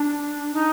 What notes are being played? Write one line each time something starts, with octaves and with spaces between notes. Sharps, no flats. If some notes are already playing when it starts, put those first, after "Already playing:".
Already playing: D4
D#4